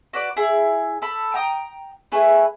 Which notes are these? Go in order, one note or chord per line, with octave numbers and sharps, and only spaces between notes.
F#4 B4 D5
E4 G#4
A4 B5
G5 A#5 D#6
A3 E4 G#4 B4